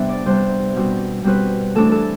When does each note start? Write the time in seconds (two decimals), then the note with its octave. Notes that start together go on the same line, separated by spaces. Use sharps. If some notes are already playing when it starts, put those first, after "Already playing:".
Already playing: C3 G3 B3 D4 E5
0.09 D5
0.26 C3 G3 B3 D4 C5
0.76 B2 G3 C4
1.24 B2 G3 C4 B4
1.75 E3 A3 D4 A4
1.92 A4